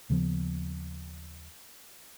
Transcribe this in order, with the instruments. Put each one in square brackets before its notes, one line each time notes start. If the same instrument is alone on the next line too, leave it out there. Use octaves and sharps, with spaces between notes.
[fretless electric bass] D#2 C#3 F3 B3